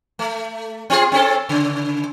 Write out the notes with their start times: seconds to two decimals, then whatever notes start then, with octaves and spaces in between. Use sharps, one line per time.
0.19 A3
0.90 C4 F4 G#4
1.12 C4 C#4 A4
1.49 C#3